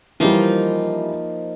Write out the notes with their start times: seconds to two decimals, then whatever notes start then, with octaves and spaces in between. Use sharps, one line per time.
0.20 E3 F3 G3 A#3 D#4